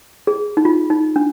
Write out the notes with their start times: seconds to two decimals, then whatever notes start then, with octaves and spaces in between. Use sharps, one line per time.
0.27 G#4
0.57 D#4
0.65 F4
0.90 D#4
1.16 D4